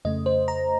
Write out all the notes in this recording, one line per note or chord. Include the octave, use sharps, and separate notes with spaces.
F2 C#3 A3 D#5
C5
A#5